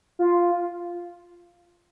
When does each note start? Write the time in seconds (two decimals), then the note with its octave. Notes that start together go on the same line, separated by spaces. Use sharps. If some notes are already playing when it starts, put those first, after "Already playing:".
0.19 F4